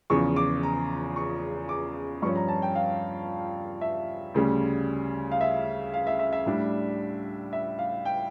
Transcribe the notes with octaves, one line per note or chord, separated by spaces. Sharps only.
E2 C#3 F3 C#6
D6
A#5
C#6
D6
G2 F3 C#4 C#6
A#5
A5
G5
F5
E5
D2 C#3 G3
F5
E5
F5
E5
E5
E5
A2 G3 D4
E5
F5
G5